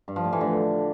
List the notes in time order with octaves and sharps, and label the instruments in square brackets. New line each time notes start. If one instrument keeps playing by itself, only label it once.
[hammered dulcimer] G2
F3
A2
E3
D3